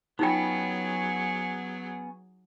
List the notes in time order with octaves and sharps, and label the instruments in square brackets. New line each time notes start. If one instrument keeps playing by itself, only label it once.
[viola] F#3 G#4 [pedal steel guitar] B3 C#4 [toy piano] D#4 F4 G5